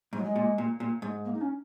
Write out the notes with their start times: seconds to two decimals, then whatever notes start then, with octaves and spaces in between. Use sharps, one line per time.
0.13 G#2
0.17 F#3
0.24 G#3
0.36 A#2
0.58 A#2
0.80 A#2
1.02 G#2
1.25 A#3
1.34 D#4
1.41 C#4